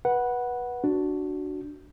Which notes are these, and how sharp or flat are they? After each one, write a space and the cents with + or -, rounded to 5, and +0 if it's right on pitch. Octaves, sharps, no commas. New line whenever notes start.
B4 -20 F#5 +0
D4 +0 F#4 +0